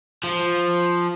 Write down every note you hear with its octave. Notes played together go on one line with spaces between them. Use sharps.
F3